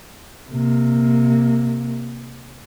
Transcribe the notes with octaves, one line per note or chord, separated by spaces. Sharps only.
C3 A#3